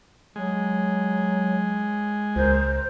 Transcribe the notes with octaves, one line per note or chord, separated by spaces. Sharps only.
F#3 G#3
C#2 A#4 C5